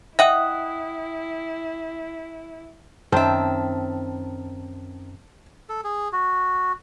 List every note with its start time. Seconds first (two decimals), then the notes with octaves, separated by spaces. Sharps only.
0.19 E4 D#5 E5 F#5 G5 D#6
3.12 F#2 D#3 C4 C#4 E5 A5
5.69 A4
5.84 G#4
6.13 F#4